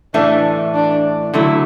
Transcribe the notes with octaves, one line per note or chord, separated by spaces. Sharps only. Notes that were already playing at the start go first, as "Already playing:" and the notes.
A2 E3 A3 D4
D4
D3 F#3 A3 E4